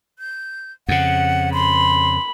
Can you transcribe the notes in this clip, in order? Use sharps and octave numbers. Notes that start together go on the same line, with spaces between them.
G6
F2 C#3 F#5
B5 C6